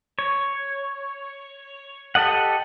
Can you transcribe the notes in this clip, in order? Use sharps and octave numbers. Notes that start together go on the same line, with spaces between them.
C#5
G4 A4 D#5 F#5